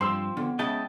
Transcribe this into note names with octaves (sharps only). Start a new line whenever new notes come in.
G2 F3 C4 C6 E6
D3 B3
C#3 G#3 E4 D#5 G5 A5